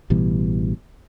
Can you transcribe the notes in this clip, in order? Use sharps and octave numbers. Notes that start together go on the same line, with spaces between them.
A1 B2 E3 G3